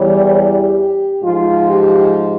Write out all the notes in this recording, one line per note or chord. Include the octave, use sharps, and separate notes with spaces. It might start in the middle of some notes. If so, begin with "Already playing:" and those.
Already playing: E2 E3 G3 C#5
G4
G#2 F3 F4
G4